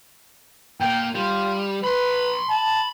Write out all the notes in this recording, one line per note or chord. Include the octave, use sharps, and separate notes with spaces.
A#2 A#3 G5
G3 F4
B4 B5 C6
A5